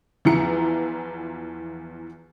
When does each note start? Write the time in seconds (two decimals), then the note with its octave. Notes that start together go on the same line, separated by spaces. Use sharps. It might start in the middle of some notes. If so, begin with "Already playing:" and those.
0.25 E2 E3 F3 E4 A#5 C#7